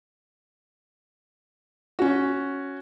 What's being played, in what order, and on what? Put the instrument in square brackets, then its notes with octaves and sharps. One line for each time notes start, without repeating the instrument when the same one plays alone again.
[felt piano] C#4 F#4